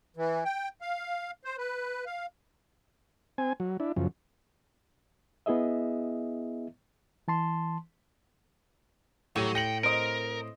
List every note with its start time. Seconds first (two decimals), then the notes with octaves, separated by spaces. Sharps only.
0.17 E3
0.45 G5
0.81 F5
1.45 C5
1.58 B4
2.06 F5
3.38 C4 G#5
3.60 F#3
3.80 D4 E4
3.97 F#2 C#3 F3
5.46 B3 E4 G#4 D#5 E5
7.28 E3 A5 C6
9.36 A2 F#3 G4 D#7
9.55 G5 A#6 C#7 F#7
9.83 C4 A#4 D#5 D7